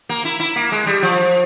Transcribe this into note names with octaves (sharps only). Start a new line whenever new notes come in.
A#3
E4
E4
A#3
G#3
G3
F3